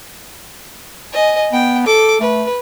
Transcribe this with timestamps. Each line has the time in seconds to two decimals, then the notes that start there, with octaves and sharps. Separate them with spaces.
1.13 D#5 G#5
1.53 B3 G5
1.87 A4 D6
2.20 A3 B4